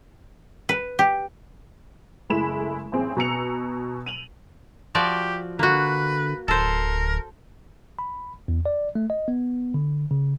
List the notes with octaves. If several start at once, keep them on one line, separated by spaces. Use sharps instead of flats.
B4
G4
F#1 G#3 A3 E4 B5 E7
A1 C4 G#4
B2 G#5 A#5 E6 C#7 F7
D#7 F7 F#7
F3 F#4 G4 D5
D3 A#3 F#4 B4
D1 A4 A#4 C5
B5
E2
D5
A3
D#5
B3
D3
C#3